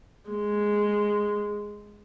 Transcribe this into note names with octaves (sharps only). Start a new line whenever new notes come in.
G#3